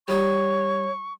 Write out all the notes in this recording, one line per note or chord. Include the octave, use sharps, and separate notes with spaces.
G3 D#4 G4 C#5 C#6